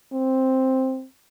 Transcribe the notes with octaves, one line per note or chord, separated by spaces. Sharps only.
C4